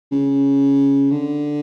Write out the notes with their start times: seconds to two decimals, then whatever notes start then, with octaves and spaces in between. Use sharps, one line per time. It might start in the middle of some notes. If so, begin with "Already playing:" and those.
0.12 C#3
1.12 D3